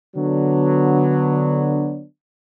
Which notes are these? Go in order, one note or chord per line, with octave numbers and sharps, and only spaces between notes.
D3 F#3 B3 D4